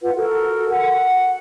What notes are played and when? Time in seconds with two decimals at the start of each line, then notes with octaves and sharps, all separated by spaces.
0.02 F4 B4 F#5
0.15 F#4 A4 A#4
0.69 F#5